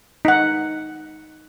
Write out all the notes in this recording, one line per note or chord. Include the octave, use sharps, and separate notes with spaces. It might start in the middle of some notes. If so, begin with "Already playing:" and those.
D#4 F#5